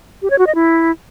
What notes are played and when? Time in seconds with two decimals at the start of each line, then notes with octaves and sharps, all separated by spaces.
0.22 G4
0.30 C#5
0.39 F#4
0.47 D#5
0.55 E4